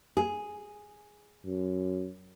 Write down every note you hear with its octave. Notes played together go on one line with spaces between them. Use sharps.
G#4
F#2